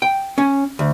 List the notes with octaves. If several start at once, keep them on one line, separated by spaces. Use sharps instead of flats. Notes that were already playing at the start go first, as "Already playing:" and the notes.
G5
C#4
D2